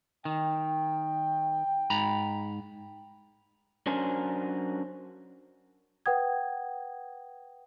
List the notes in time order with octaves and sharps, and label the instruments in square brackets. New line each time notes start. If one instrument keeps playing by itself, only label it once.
[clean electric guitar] D#3 [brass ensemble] G5
[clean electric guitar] G#2 A#5 B5
[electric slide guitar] F#3 C#4 D4 A#4 C5 G#5
[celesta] B4 F#5 G5 D#6 G#6